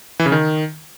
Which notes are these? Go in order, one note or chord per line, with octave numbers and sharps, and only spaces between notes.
E3
C#3
D#3